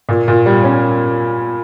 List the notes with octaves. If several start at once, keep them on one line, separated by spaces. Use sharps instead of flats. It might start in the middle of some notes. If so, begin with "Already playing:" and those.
A#2
A#2
G3
C#4